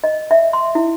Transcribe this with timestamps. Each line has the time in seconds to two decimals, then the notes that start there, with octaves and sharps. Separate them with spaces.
0.04 D#5
0.31 E5
0.53 C6
0.75 E4